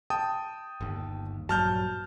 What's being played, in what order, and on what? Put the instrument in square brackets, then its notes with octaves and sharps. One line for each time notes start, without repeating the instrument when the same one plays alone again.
[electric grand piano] G5 A5 D#6
[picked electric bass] G1 D#2
[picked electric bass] A#1 G2 F#3 [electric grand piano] A5 F6 G6